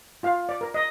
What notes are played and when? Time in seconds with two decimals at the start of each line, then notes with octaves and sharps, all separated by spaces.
0.23 F4 F5
0.49 D5
0.61 A#4
0.74 D#5